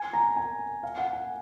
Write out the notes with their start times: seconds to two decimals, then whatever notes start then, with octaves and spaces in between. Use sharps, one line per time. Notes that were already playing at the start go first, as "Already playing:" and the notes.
Already playing: G#5
0.13 A#5
0.37 G#5
0.83 F5
0.98 F#5
1.13 G#5